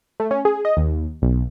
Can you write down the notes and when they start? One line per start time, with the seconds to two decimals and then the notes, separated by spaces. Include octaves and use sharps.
0.20 A3
0.31 C#4
0.45 G#4
0.65 D#5
0.77 D#2
1.22 B1